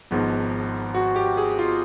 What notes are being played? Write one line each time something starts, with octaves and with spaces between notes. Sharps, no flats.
G#1 G#2 F3 G#3 B3
F#4
G4
G#4
F4